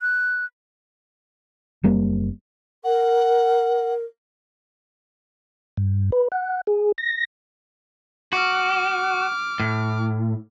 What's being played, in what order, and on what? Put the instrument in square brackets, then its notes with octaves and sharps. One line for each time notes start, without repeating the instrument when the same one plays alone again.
[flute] F#6
[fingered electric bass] F#1 G3 A#3 C4
[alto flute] A#4 [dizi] F#5
[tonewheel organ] G2
B4
F#5
G#4
A#6
[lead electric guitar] F#4 [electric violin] D6 F6
[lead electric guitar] A2